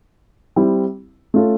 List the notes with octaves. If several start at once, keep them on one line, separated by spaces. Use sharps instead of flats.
G3 C4 E4
A3 C#4 F4 A4